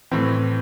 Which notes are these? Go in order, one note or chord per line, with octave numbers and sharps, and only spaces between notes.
A2 E3 C4